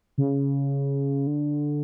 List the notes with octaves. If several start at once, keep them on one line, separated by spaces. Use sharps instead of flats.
C#3
D3